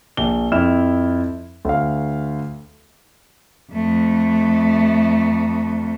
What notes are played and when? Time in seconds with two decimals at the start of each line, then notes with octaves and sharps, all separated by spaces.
0.17 A#1 G7
0.52 F2 E4 F6 E7
1.65 D2 F5
3.72 F2 A3